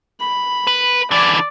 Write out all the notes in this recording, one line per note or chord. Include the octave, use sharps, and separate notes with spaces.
B5
B4
D3 E3 D5